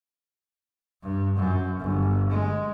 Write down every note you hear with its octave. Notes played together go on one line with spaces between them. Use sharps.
G2
F#2
G1
G#3